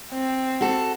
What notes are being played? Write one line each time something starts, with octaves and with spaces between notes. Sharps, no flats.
C4
F#4 A4